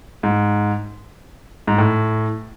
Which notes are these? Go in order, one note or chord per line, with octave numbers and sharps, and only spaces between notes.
G#2
G#2
A2